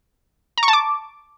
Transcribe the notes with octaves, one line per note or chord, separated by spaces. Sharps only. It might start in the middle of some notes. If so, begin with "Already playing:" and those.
A#5
C#6
A5
D6